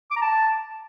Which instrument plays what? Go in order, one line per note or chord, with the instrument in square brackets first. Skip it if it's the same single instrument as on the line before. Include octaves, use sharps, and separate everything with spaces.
[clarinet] D6
A#5
A5